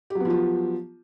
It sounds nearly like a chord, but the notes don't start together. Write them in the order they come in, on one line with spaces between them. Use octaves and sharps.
G4 F#3 B3 F3 F4